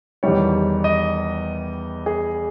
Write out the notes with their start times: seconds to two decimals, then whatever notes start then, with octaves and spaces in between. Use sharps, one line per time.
0.23 E2 D#3 G3 C#5
0.84 D#5
2.06 G#4